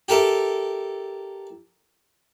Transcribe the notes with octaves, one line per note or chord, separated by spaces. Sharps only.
G4 A4 A#4 E5